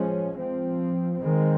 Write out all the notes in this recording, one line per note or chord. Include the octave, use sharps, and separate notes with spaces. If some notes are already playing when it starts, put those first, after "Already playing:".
Already playing: F3 G#3 C#4
F3 C4
D#3 G#3 C4